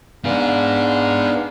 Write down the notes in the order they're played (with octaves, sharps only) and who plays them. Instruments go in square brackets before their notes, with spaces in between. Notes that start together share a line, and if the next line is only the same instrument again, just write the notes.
[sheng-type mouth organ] B3 D4 F5 [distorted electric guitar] D#4 G#4